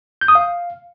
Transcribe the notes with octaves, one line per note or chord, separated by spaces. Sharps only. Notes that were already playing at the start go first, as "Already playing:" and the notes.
G6
D#6
F5